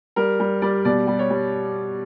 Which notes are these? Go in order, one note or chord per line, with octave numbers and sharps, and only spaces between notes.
G3 A#4
G3
G3 D5
B2 D5
G3
C#5
G3